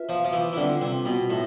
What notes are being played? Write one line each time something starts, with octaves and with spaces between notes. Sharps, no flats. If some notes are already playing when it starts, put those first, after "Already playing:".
Already playing: F4 B4 E5
F3
F3
E3
E3
D3 G3 C4 F4 B4
C3
B2
A2 A3 C4 F4 C5 E5